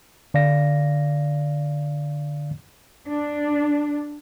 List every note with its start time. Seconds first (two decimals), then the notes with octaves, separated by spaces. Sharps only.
0.34 D3 D5 F5 A#6
3.07 D4